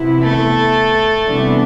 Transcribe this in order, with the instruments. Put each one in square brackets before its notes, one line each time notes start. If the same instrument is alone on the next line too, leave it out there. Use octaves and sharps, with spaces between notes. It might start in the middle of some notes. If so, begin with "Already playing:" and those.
Already playing: [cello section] C3 E3 B3 E4
[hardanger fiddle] A3
[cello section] C3 E3 G3 B3 D4